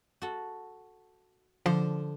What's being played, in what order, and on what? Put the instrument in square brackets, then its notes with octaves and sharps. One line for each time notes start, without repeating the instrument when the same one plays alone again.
[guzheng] F#4 A4
[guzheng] D3 [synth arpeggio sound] F3 C5